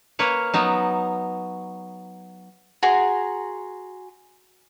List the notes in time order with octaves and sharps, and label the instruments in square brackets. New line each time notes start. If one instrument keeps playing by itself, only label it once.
[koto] A#3 A#4 B4 C#5
F#3 B3 D#4
[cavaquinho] F#4 G#4 A#5 C6